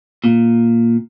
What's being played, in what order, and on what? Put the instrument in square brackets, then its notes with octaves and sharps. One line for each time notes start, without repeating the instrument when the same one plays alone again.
[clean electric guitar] A#2